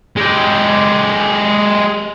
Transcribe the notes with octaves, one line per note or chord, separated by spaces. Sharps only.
G#3 G4